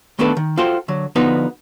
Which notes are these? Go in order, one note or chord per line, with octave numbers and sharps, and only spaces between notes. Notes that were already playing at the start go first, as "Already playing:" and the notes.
D#3 A3 B3 D4 A4 B4
D#3
F4 F#4 A4 C5 G5
D3 F#3
D3 F3 B3 D#4 F#4 B4